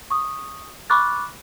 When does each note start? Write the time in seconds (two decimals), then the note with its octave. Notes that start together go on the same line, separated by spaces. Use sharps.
0.10 C#6 D#6
0.90 B5 C#6 D6 F6 F#6 A6